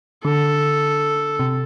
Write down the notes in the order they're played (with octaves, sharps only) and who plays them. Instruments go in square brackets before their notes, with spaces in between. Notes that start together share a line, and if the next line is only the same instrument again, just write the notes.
[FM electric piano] D3 [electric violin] A4
[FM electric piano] C3